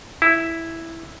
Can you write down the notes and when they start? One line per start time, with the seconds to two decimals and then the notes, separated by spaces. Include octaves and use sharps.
0.22 E4